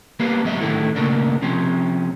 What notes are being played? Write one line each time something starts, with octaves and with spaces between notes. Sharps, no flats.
G3 A#3 B3 B4 F5
G#2 F#3 G3 D#5 E5
A2 D3 D#3 A3 E4
G2 A#2 C#3 A3 A#3 D4
C3 F3 C#4